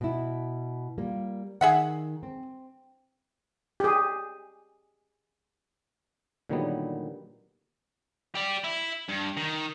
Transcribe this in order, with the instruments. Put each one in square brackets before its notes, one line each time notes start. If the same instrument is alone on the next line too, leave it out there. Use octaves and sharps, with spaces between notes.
[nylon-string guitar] B2 E4
G3 A#3 F4
[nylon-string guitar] D#3 [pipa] G#4 E5 F#5
[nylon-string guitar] C4
[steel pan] G4 G#4
[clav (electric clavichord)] A#2 D3 D#3 F#3 G3 B3
[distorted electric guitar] G4 D5
E4
G2
D#3